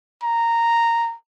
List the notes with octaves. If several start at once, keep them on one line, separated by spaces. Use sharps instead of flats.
A#5